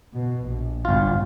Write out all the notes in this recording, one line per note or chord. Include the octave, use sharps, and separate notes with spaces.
B2
A#1
G1 F4